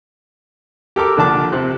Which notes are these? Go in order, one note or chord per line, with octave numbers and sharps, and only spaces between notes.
G4 A4 A#4 D6
A#1 D3 D4 A5 D6
C3 C4 F#6